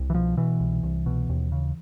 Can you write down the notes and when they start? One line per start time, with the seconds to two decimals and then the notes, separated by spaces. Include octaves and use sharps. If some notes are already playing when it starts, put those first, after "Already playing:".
Already playing: C2
0.10 E3
0.14 B2 F3
0.37 B2 E3
0.60 C2
0.83 C2
1.06 B2
1.30 D#2
1.52 C#3